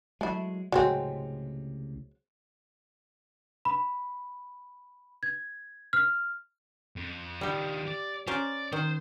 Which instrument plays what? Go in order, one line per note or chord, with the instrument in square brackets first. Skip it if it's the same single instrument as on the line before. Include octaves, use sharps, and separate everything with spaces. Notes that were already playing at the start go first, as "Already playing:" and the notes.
[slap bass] F#3 G#3 [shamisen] A3 E4
[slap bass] C#2 A2 C3 [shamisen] F#3 G#3 C4
[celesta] B5
G#6
F6
[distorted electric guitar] F2
[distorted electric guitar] D#3 F3 [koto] G3 G4
[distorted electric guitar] D5
[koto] C#4 A#4 C5 [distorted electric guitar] D5
[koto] D#3 [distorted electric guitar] C5